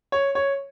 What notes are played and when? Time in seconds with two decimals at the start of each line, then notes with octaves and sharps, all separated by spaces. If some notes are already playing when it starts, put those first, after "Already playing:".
0.12 C#5
0.35 C#5